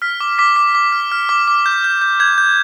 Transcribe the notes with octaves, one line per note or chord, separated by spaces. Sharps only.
F6 B6
D6
D6 B6
D6
D6
F6
F6
D6
D6
G6
G6
G6
G6 G#6
G6